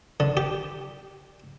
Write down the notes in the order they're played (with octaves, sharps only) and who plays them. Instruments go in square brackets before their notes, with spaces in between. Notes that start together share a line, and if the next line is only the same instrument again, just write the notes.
[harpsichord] D3
G4